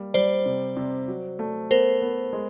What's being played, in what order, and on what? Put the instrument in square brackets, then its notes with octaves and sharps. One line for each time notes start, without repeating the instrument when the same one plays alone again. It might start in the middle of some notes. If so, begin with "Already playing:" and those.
Already playing: [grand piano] G3 A#3
[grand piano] G3 [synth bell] C5 D5
[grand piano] C3
C3
F#3
A3
[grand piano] B3 [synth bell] A#4 C5
[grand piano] B3
G#3